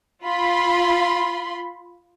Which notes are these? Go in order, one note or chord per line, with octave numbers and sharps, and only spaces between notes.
F4 B5 C6